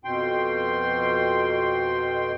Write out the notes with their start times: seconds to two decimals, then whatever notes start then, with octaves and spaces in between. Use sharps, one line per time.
0.05 F2 B2 G5 C6